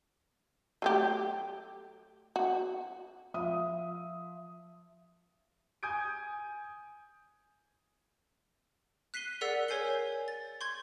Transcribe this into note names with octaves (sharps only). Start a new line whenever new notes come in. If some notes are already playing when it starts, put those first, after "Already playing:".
F#3 A3 G4
F#4
F3 E5 D#6
G#5 D#6 G6 G#6 D7
F#6 B6 C7 D#7 G7
G#4 A#4 D5 F#5 E6 B6
A#4 C#5 G#5 G6 C7 G7
A6
C6 C#6 G6 G#6